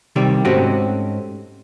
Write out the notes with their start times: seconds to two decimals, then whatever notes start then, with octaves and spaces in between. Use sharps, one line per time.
0.16 C3 D#3 G3 D5
0.45 G#2 A3 C4 C#4 F#4 G4